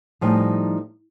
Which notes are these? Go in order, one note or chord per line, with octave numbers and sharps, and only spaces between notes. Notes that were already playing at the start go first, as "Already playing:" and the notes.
A2 F3 G3 D#4 G#5